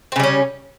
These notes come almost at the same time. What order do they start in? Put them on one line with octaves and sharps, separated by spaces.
C4 C#3 G3 C#4